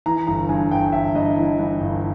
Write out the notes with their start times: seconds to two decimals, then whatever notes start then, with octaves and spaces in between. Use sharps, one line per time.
0.06 E3 A#5
0.27 G1 A#5
0.49 G2 G#5
0.71 G1 G5
0.92 G1 E5
1.15 G2 D#5
1.37 E3
1.59 G2
1.81 G1